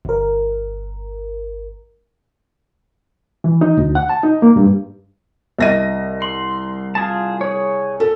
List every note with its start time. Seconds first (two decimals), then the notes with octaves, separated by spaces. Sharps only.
0.05 G1 A#4
3.44 E3
3.61 D#4
3.77 D2
3.95 F#5
4.09 A5
4.23 D#4
4.42 A#3
4.56 G2
5.59 C2 D#5 E5 A#6 D#7
6.22 C6 F#7
6.95 F4 G#4 A5
7.41 G#4 C#5
8.00 A4